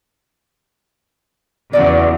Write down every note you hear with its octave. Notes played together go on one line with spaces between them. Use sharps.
E2 A#2 C#3 F#4 D5